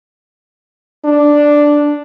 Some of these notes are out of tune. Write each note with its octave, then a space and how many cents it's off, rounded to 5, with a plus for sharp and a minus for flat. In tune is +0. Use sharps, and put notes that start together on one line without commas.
D4 +0